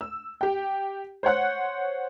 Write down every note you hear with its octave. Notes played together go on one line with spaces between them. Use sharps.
E6
G4 G5
C5 C#5 F#5 F#6